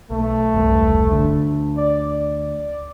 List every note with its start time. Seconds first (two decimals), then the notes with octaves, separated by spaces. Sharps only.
0.10 B1 A3
0.54 E1 C2 G2
1.09 D2 D3
1.77 D5
2.12 D5